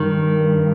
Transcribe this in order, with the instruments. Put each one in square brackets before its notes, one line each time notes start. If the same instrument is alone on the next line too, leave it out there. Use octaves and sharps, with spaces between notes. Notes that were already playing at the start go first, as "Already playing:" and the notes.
Already playing: [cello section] G2 [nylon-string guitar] D#3